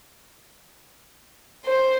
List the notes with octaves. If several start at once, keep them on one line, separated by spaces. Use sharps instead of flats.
C5